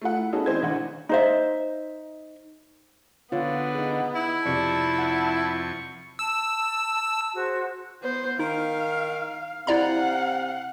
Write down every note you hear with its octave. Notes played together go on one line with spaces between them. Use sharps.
A3 F4 F#5
E4
B3 C#4 D#4 F#4 G#4 A4
E3 C4 E4 C5 D#5 G#6
G#1 D2 F#5
D#4 C5 E5
D3 B3 F4 C#5
D#4 G#4
E4
F2 C3 D5 A5 C#6
F#5
A5 E6
F#4 G#4 C5
B3 C5
D#3 D#4 F5
C3 E4 D5 F5 F#5 A#5